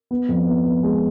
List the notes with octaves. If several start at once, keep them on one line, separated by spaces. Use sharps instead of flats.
B3
F2
B3
B3
G#3